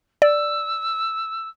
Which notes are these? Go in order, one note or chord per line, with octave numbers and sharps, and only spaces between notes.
D5 E6